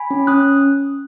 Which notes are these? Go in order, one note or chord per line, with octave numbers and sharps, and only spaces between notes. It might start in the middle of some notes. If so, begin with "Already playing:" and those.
Already playing: G#5 B5
C#4
C#4 D#6 F#6